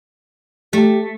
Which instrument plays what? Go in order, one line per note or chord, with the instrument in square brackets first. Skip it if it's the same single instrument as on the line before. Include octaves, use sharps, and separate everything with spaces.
[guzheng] A3 [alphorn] G4